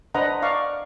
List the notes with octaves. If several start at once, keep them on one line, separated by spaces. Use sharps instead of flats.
D4 B4 C5 D#5 F#5 A#5
D5 F5 C#6